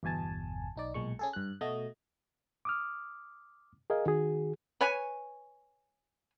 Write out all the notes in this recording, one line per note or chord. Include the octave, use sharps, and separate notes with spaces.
G1 E2 B2 G#5 A5
B1 D#4 D5
B1 A#2 G#3 C#6
C#4 G#4 A4
G2 F#6
B2 A3 F#4 D#5
D6 D#6 F6
G#4 A#4 D#5 F5 G#5
D#3 F#4 G#4
B4 C#5 G#5